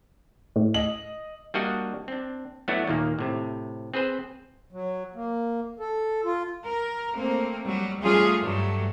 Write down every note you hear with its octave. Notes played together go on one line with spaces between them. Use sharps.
A2
D#5 F#7
G3 A#3 D4 F#4 D#5 F#5
C4 D4
F#3 A3 B3 D4 E4 F#4
D#2 A#2 D#3 A#3
A2 C3
C4 G#4 B4 C5
F#3
A#3
A4
F4
A#4
A3 A#3 C4
F#3 G3
F#3 G3 A3 C#4 F4 G#4
G2 F#3 A3